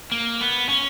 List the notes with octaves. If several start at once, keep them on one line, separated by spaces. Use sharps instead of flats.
A#3
B3
C#4